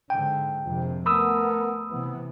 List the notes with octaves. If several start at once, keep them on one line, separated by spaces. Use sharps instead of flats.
G#2 D3 G5
A#1 F2 C3
A3 B3 A#4 B5 D#6 E6
C3 E3 B3